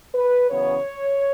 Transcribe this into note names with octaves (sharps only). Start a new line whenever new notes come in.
B4
F#2 C#3 E3 B3 C#5